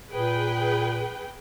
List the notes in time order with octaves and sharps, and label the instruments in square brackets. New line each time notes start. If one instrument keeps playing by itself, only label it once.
[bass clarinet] A#2 [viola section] G#4 B4 G5